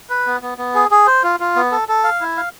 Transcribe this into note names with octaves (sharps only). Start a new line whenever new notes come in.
B4
B3
B3
B3
G#4
G#4
C5
F4
F4
B3
A4
A4
F5
E4
F5